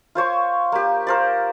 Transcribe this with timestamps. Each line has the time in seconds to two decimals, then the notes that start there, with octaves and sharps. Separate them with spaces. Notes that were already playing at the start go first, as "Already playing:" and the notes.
0.15 F4 C5 C#5 C6
0.72 A#3 G4
1.07 A#4 C5 D5